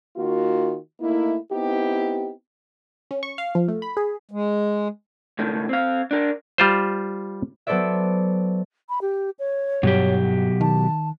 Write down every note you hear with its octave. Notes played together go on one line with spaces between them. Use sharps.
D#3 A#3 F4 F#4
A3 A#3 D#4 E4
B3 C4 D#4 E4 G4
C#4
C#6
F5
F3
A3
B5
G#4
G#3
C#2 A2 D#3
C4 F5
D4 A#4
G3 F4 C5
F#3 B3 A4 C5 D5 E5
B5
G4
C#5
G2 B2 F#3 G4
D#3 A5